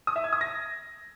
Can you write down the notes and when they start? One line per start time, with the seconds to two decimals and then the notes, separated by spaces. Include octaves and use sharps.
0.07 D#6
0.16 E5
0.24 G#6
0.33 D#6
0.41 A#6